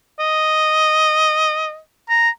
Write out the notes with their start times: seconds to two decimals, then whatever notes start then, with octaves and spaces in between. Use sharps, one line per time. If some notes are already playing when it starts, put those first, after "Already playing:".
0.19 D#5
2.09 A#5